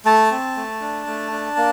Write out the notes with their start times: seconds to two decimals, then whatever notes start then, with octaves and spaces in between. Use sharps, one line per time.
0.05 A3 A5
0.31 C4
0.56 A3
0.81 D4
1.07 A3
1.32 D4
1.57 A#3